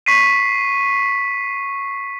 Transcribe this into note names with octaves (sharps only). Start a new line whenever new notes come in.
C#6 B6 C7 D#7